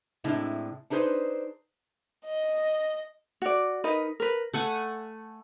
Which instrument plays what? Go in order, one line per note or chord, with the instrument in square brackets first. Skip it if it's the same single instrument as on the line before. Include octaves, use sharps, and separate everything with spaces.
[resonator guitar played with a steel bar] A2 C3 G#3 D4 E4
D4 D#4 G#4 B4 C5
[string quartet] D#5
[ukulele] F#4 D5
D#4 A#4 B4 D#5
A#4 B4
[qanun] A3 F#5 G#5